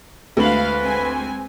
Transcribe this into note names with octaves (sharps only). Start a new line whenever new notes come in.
D2 G#3 E4 B4 F5 F#7
G#3 C4 G#5